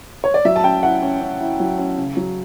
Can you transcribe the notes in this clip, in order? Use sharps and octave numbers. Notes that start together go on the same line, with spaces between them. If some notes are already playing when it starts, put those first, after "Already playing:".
C#5
D5
F#3 E5
A5
C#4 G5
E4 F#5
C#4
C#4
E4
F#3
C#4
C#3
F#3